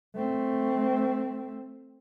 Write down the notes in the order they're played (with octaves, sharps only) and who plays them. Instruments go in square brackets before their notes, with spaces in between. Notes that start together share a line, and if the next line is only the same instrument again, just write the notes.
[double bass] A3 C4